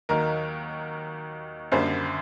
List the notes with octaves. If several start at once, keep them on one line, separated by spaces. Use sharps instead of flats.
D#2 D#3 F#3 A#4
F#2 D3 G3 A#3 C5